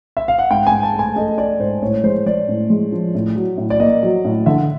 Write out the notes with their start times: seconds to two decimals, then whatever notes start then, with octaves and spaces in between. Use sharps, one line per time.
0.17 E5
0.28 F5
0.38 F#5
0.50 G#2 G5
0.67 G#2 G#5
0.83 A5
0.94 A3
0.99 G#5
1.16 A3 D#5
1.38 A3 D5
1.59 G#2 C5
1.82 A2 C#5
2.04 G#3 C5
2.26 G#3 D5
2.48 A2
2.70 G#3
2.92 F3
3.15 A2
3.36 F#3
3.57 A2
3.70 D5
3.80 A#3 D#5
4.03 F#3
4.25 A2
4.46 D3 E5